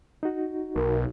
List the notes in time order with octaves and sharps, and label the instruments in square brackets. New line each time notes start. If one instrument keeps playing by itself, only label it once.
[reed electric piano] D#4 F#4
[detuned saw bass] B1 [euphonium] A#4